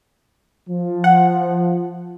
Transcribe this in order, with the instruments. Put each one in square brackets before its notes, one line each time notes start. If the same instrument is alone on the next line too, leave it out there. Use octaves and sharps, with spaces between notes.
[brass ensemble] F3
[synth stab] F#5